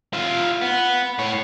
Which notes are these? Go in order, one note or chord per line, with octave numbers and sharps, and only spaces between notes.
F4 E5
B3
A2 C#5